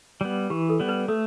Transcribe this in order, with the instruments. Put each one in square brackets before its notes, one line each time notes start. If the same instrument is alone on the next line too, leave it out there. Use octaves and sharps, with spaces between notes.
[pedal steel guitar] G3 B3
[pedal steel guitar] E3 [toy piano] G4
[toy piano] A4
[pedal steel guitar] G3 B3
[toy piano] B4
[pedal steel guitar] A3 [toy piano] A4